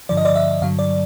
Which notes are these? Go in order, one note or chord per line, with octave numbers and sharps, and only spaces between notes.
G2 D3 F3 D5
D#5
D5
E5
G2 D3 F#3 F5
D5